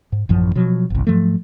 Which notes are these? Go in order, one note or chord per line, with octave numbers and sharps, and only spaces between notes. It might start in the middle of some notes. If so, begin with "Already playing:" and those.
G#2
A1 F#2 F3
B2 F3 F#3
G1 C2
G#2 F3 F#3 A3